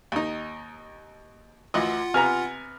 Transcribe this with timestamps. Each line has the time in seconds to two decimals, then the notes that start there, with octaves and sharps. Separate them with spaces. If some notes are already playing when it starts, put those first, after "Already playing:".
0.12 D#2 D#4
1.74 D2 E3 F4 D#5 F#5
2.14 C3 B3 G#5 A#5 F6